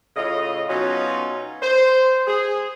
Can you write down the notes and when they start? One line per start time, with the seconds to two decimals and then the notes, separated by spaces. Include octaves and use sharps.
0.16 A2 C#3 F4 D#5
0.69 B2 F#3 B3 C#4 D#4 F4
1.62 C5
2.27 G#4